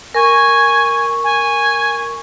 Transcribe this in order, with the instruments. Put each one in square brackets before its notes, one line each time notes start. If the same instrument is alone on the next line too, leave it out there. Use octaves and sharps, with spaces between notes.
[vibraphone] A#4 C#6 [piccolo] G#5
[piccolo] G#5